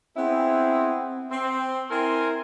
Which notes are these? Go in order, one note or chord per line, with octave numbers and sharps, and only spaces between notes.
B3 C4 E4 G#4
C4
C4 E4 A#4 G#5 C6